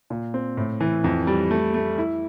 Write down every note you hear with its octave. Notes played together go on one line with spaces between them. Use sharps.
A#2
C4
A2
E3
F2
G3
A3
A3
E4